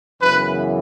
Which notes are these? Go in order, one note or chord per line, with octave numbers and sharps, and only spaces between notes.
F#2 C#3 E3 B3 B4